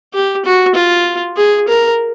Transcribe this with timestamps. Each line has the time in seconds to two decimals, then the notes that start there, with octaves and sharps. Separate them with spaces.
0.14 G4
0.45 F#4
0.75 F4
1.37 G#4
1.68 A#4